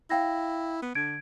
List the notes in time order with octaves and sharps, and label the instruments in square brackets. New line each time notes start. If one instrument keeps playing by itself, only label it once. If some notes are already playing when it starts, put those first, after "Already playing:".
[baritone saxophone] E4 [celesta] F5 G5 A#6
[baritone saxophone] B3
[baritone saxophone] D3 [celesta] G#6 D7